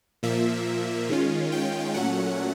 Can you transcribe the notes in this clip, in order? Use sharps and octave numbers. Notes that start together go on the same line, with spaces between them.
A#2 F3 A#3 E5
D#3 G#3 C#4 F4
G5
A#2 F#3 A3 C#4 F#5